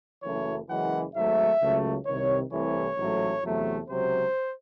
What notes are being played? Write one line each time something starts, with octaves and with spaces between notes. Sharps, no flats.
F#1 F#2 E3 A3 C#5
F#1 F#2 E3 G#3 F#5
G#1 G#2 F#3 A3 E5
C#2 C#3 F#3 A3
C2 C3 D#3 C#5
C2 C3 E3 A3 C#5
A1 G#2 F#3 A3
E2 C3 F#3 A3
C#2 C3 F#3 C5